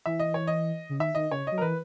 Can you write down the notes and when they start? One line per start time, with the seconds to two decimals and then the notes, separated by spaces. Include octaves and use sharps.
0.06 E3 E5
0.20 D#5
0.34 C#5
0.47 D#5
0.89 C#3
1.00 D#3 E5
1.15 D#3 D#5
1.31 C#3 C#5
1.47 F#3 D#5
1.58 A#4
1.61 E3 B4